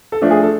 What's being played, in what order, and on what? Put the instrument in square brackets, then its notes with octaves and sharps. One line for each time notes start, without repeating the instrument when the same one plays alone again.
[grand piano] A4
F3 A3 D4
G#4
A4